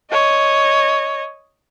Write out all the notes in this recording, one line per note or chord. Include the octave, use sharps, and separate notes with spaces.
C#5 D#5